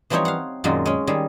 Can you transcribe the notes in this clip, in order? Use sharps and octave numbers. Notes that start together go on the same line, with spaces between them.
E3 F3 G3 C4 D#4 C#5
F5 F#5
F#2 A#2 D#3 F#3 G#3 F4
G#3 C#4
D#3 G3 G#4